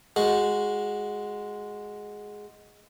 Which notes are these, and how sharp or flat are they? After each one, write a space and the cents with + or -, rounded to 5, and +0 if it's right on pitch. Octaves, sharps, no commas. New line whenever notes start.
G#3 +0 F#4 -5